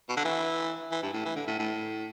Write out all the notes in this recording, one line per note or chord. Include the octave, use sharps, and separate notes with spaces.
B2
D3
E3
E3
G2
A2
E3
D3
A2
A2